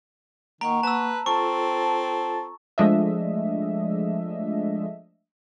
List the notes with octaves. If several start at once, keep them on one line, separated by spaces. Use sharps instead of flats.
D#3 A#3 F#5 A#5 C#6
B4 A5 E6
C4 F4 A4 A5 C#6
F3 G#3 A3 D4 D#5 E5